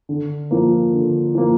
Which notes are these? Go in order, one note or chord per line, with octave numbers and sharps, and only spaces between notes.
D3
F3 A#3
D3
F3 A#3